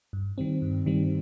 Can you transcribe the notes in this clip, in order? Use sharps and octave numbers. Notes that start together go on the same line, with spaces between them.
G2
D#3 G3 C4
G2
D#3 G3 C4